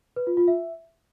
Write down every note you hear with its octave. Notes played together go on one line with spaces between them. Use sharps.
B4
F4
F4
E5